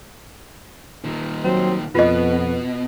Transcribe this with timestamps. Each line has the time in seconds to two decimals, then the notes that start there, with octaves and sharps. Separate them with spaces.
1.04 A#2 D#3
1.44 F#3 C4
1.95 F2 B2 B3 F4 D#5